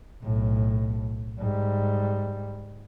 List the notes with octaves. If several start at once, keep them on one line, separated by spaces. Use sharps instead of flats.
B1 A2
G#2 G3